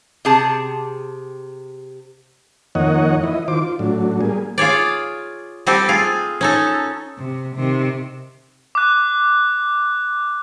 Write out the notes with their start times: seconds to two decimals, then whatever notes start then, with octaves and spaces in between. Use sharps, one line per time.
0.25 C3 G#4 A5
2.75 F2 D#3 A#3 C#5 D#5 F#5
3.24 E3 E4 D#5
3.48 D#3 F4 C5 D6
3.62 F4
3.79 A2 F#3 D4
4.21 G3 A#3 G#4
4.58 F4 G#4 C#5 D5
5.66 G3 C4 G4 A4
5.88 F4 G#4
6.41 C#4 D#4 A4
7.18 C3
7.56 C3 D#3
8.75 D6 F#6